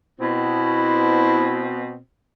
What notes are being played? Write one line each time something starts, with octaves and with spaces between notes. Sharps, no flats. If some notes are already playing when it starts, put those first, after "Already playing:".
B2 C4 E4